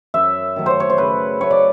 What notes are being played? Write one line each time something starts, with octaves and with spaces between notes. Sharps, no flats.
F#2 E5
D#3 F#3 A3
C5 C#5
C#5
C5
C#3 B4
F#3 A3 C#5
D5